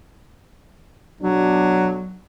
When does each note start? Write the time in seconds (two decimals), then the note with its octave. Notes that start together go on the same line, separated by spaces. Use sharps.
1.21 B1 F#3 D4